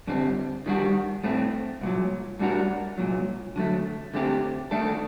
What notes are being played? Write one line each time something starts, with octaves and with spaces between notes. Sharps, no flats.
G2 D3 G3 C4
D#3 G3 D4 F#4
A2 A3 C4
C2 A#2 F#3
A2 G3 D4 F#4 A#4
C2 A#2 F#3
D3 F#3 A3
D3 A3 C4 G4
D#3 A3 D4 A4